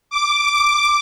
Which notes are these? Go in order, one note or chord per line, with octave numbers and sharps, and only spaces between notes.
D6
D6